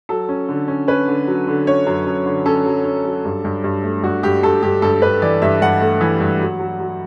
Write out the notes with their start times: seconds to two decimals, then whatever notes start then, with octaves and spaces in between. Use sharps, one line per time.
0.09 F#3 A4
0.29 C#4
0.49 D3
0.68 C#4
0.88 C#4 B4
1.08 D3
1.27 F#3
1.47 D3
1.67 C#4 C#5
1.86 F#2
2.06 F#2
2.26 D3
2.46 C#4 A4
2.66 F#3
2.85 C#4
3.05 F#3
3.25 G2
3.45 G2
3.64 G2
3.84 A3
4.03 G2 F#4
4.23 G2 G4
4.43 G2 A4
4.62 G2 G4
4.82 G2 A4
5.02 G2 B4
5.22 E3 D5
5.42 G2 E5
5.62 G2 F#5
5.81 A3
6.01 E3
6.20 G2
6.40 F#3
6.60 F#3
6.80 F#3